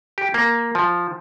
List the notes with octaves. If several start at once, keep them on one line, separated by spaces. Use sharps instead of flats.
G4
A#3
F3